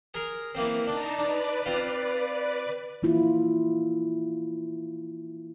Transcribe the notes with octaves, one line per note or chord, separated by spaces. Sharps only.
G#4 A#4
E3 A#3 C4
D4 D#4 A5 A#5
D4 B4 D5
C4 F4
E3 A#3 E4 F4